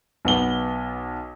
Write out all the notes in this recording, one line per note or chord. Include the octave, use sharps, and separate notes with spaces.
B1 B3 G7